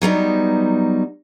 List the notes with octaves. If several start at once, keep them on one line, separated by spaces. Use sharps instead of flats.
F#3 G3 B3 D#4